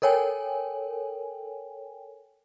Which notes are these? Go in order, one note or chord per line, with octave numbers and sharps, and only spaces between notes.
A4 A#4 C#5 G5 G#5